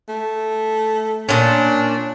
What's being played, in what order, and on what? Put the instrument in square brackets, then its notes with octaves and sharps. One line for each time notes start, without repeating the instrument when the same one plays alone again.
[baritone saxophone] A3
[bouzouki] A#2 C#4 [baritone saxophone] D4